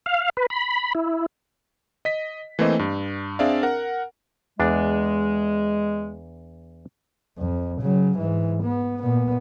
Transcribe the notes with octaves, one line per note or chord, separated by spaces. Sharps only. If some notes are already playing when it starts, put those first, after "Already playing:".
F5
B4
B5
E4
D#5 B6
E3 A3 A#3 C4 C5 D#5
G2
C4 D4 G#4 D5 E5 F5
A#4 F#5
E2 G#3 D4
F2
C#3 F#3
G#2 E3
B3
A#2 B3